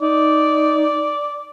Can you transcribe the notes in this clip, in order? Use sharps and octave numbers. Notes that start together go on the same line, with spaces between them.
D#4 D5